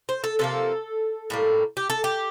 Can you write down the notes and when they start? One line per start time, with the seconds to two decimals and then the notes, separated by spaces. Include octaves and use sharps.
0.09 C5
0.24 A4
0.39 C3 F3 A#3 A4
1.30 A2 G3 A#3
1.77 G4
1.90 A4
2.04 G4